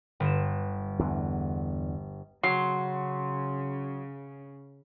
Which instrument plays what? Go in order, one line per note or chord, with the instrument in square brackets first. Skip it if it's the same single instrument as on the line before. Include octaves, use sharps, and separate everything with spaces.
[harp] G1 E7
[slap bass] E2 D3
[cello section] C#3 [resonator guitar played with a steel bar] F#3 [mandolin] C6